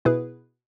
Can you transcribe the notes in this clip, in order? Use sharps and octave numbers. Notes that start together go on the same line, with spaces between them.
B2 B3 E4 G#4 B4